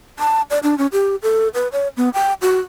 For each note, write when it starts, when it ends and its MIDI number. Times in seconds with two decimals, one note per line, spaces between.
0.19 0.42 81
0.50 0.59 74
0.63 0.77 62
0.78 0.87 61
0.92 1.16 67
1.23 1.48 69
1.54 1.68 71
1.72 1.88 73
1.97 2.09 59
2.14 2.33 79
2.42 2.58 66